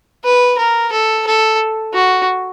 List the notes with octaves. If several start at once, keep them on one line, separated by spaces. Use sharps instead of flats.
B4
A#4
A4
A4
F#4